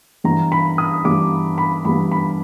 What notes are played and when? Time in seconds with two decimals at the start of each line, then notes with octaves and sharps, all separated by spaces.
0.24 G2 E3 G3 B3 A#5
0.52 B5
0.78 D#6
1.04 G2 E3 G3 B3 D6
1.58 B5
1.84 G2 E3 G3 B3 B5
2.12 B5